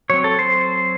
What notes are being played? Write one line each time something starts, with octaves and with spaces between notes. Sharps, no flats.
F#3 C4 C#5
A4
C5